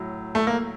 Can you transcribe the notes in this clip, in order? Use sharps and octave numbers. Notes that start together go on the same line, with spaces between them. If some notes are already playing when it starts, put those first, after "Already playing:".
Already playing: A2 F#3
A3
A#3